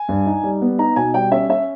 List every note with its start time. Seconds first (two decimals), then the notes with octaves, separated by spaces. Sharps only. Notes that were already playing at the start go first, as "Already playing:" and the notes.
Already playing: G#5
0.09 G2
0.26 D#4
0.43 G3
0.62 B3
0.79 D#4 A#5
0.96 B2 G#5
1.14 G3 G5
1.31 C#4 E5
1.49 C#4 E5